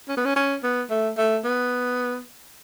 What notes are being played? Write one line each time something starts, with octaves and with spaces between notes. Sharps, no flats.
C#4
B3
C#4
C#4
B3
A3
A3
B3